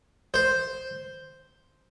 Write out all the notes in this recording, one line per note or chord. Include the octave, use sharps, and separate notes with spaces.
C5